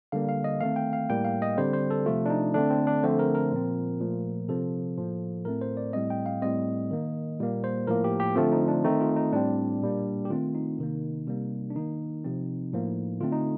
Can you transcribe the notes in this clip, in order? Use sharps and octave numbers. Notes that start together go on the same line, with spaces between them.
D3 G3 A#3 F5
F5
D#5
D#3 A3 C4 F5
G5
F5
A2 G3 A#3 G5
F5
D#5
D3 G3 C4 C5
C5
A4
C3 F3 A3 F4
D4
D#4
D3 A3 C4 D4
C4
D4
D3 F3 A3 C4 C5
A#4
A#4
A#2 F3 C4
A#2 F3 A3
C3 F3 C4 A4
A2 F3 A#3
A2 A3 C4 A#4
C5
D5
A2 G3 C4 D#5
G5
F5
A2 G3 C4 D#5
D#3 A#3
A#2 G3 A#3
C5
A2 F3 A#3 A#4
G4
G4
D3 F3 A3 C4 F4
D#4
D4
D#3 A3 C4 D#4
F4
D#4
A2 G3 C4 D4
A#2 G3 A#3
G4
D#3 A3 C4 F4
D#4
C3 D#3 A#3
C3 G3 A#3
D4
D#3 A#3 D#4
C3 F3 C4
A2 F3 A#3
D3 A3 C4 F4
D#4